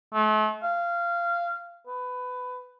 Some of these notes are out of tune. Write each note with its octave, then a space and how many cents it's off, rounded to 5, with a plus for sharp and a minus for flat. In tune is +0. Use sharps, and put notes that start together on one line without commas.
A3 -40
F5 -15
B4 +20